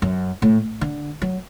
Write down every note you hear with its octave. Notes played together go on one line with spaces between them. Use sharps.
F#2
A2
D3
F#3